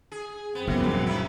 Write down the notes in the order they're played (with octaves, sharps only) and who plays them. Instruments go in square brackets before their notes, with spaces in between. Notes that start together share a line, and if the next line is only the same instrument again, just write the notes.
[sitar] G#4
[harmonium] F#2 C4 [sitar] B3
[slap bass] F#1 B2 B3 [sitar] E3
[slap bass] A#1 G2 [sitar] A#2 C#3
[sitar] C#3 F#3 E4